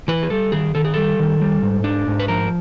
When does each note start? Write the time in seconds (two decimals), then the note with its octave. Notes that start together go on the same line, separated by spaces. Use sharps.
0.08 E3 B4
0.23 G#4
0.30 G3 A4
0.52 D#3 G#4
0.75 D#3 A4
0.85 G#4
0.94 G3 A4
1.19 D#3
1.41 G3
1.62 G#2
1.84 D4
2.07 G#2
2.20 B4
2.28 F3 A#4